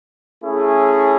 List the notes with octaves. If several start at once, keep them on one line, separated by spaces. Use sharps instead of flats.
A3 C#4 E4 G#4